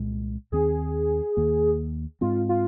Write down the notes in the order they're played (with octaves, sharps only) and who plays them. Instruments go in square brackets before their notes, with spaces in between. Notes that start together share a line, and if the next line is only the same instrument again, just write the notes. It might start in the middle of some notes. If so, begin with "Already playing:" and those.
Already playing: [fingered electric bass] C2 A#2 G#3
[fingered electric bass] D#2 D#3 C4 [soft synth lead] G#4
[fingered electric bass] D#2 D#3 A#3
[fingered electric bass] G#2 G#3 C4 [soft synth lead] F4
[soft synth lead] F4